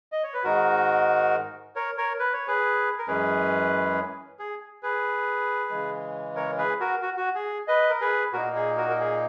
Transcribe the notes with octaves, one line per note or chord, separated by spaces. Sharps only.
D#5
C#5
B4
G#2 D#3 G#3 D#4 F#4 A#4
A#4 C#5
A#4 C#5
B4
C#5
G#4 B4
A#4
F#2 E3 G#3 C#4 G#4 B4
G#4
G#4 B4
C#3 E3 G#3
A#4 C#5
G#4 B4
F#4 A#4
F#4
F#4
G#4
B4 D#5
A#4
G#4 B4
A#2 A#3 D#4 F#4 A#4
G#4
F#4 A#4
A#4
G#4